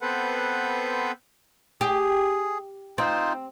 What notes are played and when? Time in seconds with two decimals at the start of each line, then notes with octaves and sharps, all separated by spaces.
0.01 B3 C4 A4 B4 C5 F#5
1.81 G4 G#4
2.98 C4 D#4 F4 C5